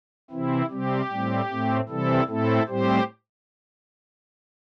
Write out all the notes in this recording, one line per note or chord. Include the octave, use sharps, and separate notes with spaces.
C3 E3 C4 E4
C3 G3 C4 G4
A2 G3 C4
A2 A3 C4
C3 E3 G3 C4 E4 A4
A2 A3 C4 E4 A4
A2 G3 C4 G4 C5